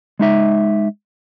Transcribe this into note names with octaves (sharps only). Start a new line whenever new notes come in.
G#3 D#4 E5